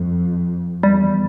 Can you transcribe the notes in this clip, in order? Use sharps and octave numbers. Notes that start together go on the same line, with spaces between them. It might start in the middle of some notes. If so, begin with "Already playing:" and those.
Already playing: F2
E2 G3